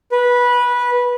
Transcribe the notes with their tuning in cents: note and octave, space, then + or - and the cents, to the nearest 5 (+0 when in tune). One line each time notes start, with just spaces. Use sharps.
B4 -15